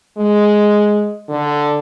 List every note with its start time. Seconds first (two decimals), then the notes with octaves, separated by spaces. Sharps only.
0.17 G#3
1.29 D3